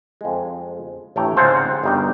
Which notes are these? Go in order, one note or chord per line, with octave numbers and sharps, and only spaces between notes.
F2 G#3
A1 A3 D4 C#5 G5 A#5
G#2 C#3 C4 F4 C5 F#5
G1 G3 D#4 F#4 G5